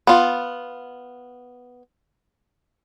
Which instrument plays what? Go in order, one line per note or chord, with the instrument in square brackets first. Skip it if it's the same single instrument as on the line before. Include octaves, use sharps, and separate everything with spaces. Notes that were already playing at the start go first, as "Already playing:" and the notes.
[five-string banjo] B3 F4